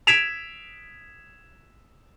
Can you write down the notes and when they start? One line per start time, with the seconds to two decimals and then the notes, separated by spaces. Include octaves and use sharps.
0.07 G#6 B6 D7 E7 F7